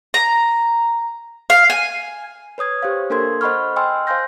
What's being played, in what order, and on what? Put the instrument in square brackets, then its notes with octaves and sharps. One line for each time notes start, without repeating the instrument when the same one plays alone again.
[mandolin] A#5
F5
G#5
[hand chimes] B4 C#5 D#6 G#6
G4 C5 C#5 F5
A#3 D4 A4 A#4 C6 G#6
C5 D#5 F#5 B5 C#6 F6
D#5 G5 G#5 C6 E6 F6
C5 F5 G#5 C6 G6 A#6